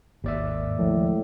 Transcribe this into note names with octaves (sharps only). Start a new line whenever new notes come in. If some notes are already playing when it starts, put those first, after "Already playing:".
G#1 D#2 D5 E5
A2 F3 G#3